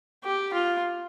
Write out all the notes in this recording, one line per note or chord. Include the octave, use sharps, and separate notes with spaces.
G4
F4